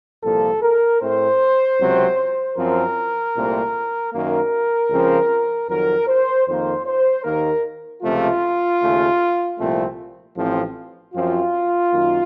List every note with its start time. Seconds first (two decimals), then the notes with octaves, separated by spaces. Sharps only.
0.22 C2 A#2 F3 A4
0.62 A#4
1.00 A2 A3 C4 C5
1.79 C#2 C3 F#3 C4
2.57 F#2 F3 C4 A#4
3.34 C2 A#2 A3 C4
4.13 F#2 D#3 A#3 A#4
4.90 C#2 C#3 F3 C4
5.68 F2 D#3 F#3 A#4
6.07 C5
6.47 F2 D#3 A#3 C5
6.85 C5
7.24 D#2 D#3 A#3 A#4
8.02 C#2 C3 F3 A3 F4
8.80 D#2 C#3 A3
9.59 C2 A#2 F3 A3 C4
10.36 A1 A2 F3 C4
11.14 F#2 F3 C4 F4
11.92 F#2 D#3 A#3